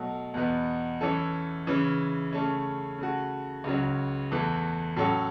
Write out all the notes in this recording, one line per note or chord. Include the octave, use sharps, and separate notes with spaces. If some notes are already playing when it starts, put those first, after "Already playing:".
Already playing: B2 F#3 A3
E2 B2 B3
E3 C#4 A4
C#3 E3 C#4
C#3 A3 C#4
C#3 A3 F#4
C#2 C#3 F#3 C#4
E2 E3 A3
A2 F#3 C#4 A4